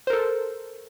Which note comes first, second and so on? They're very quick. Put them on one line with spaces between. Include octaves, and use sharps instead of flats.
C5 A#4 A4